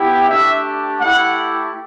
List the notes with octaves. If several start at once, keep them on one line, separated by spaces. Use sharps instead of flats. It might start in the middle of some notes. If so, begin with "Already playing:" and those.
Already playing: B3 E4 G4
A3 D4 G4 E5
A3 E4 G4 F#5